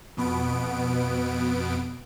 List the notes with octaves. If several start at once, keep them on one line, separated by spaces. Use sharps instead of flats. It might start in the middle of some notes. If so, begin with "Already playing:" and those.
F2 B2 B3 D7